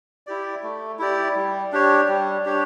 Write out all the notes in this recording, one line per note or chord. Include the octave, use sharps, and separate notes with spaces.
E4 G4 D5
A3
E4 G4 D5
G3
D4 G4 C#5
G3
D4 G4 C#5